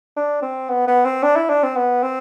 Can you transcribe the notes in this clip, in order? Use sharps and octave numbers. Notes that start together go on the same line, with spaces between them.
D4
C4
B3
B3
C4
D4
E4
D4
C4
B3
C4